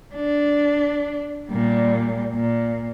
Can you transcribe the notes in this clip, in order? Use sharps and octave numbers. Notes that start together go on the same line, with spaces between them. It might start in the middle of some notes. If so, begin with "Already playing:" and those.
D4
A#2 G3
A#2